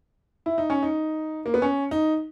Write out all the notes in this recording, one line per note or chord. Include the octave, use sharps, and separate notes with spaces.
E4
D#4
C#4
D#4
A#3
B3
C#4
D#4